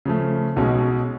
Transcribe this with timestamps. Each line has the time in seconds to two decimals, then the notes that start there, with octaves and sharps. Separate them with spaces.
0.05 C#3 F3 A3
0.56 B1 B2 G#3 C#4